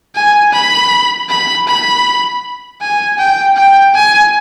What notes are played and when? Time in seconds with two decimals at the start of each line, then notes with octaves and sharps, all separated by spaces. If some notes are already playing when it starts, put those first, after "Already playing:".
0.15 G#5
0.53 B5
1.29 B5
1.67 B5
2.81 G#5
3.19 G5
3.56 G5
3.95 G#5